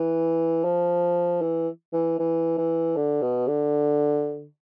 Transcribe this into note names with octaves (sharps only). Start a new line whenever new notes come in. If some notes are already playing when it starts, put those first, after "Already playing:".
Already playing: E3
F3
E3
E3
E3
E3
D3
B2
D3